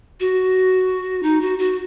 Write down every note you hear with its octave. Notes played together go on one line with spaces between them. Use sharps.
F#4
D#4
F#4
F#4